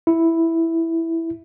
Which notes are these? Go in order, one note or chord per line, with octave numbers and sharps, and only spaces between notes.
E4